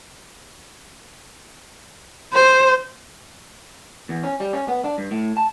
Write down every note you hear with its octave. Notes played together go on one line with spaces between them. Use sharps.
C5
E2
C#4
G3
C#4
B3
D4
G2
A2
A5